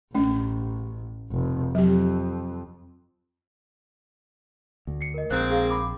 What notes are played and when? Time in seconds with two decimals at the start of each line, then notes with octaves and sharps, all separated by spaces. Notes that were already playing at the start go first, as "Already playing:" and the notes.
0.15 A1 A3 C#4
1.31 F1
1.75 F2 F#3 G4
4.87 D2
5.01 C7 C#7
5.14 A#4 D#5
5.31 A#1 G#2 A#3 C4 F#6 A6
5.51 G#4 F5
5.70 B5 D6